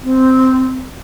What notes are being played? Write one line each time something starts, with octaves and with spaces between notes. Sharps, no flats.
C4